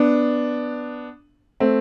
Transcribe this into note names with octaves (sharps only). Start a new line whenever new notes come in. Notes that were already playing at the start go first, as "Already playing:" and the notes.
Already playing: B3 D4
A3 C4